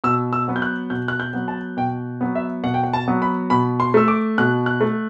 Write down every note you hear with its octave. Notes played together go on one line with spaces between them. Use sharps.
B2 E6
E6
F#3 B3
G6
F#6
B2 G6
F#6
G6
F#3 B3
A5
B2 G5
F#3 B3
E5
B2 F#5
G5
F#5
A5
F#3 B3
B5
B2 B5
C6
A3 E6
D6
B2 F#6
F#6
A3